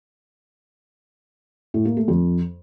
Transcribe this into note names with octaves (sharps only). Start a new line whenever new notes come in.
A2
A#3
A3
F2